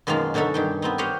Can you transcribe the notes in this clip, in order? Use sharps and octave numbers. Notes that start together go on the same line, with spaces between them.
F#2 B2 D#3 G#3 A#3 F4
B2 D3 C#4 D#4 A4 E5
G2 D#3 G5
B3 C4 D#4
G4 C5 C#5 D#5 F5 F#5